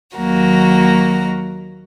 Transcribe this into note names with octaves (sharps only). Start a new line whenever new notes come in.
D#2 D#3 F#3 A#3 F#4 A#5